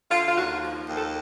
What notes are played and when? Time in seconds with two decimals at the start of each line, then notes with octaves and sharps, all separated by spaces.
0.11 D3 F4
0.26 F4
0.36 D#2 F#4
0.62 F3
0.88 D#2
0.97 A4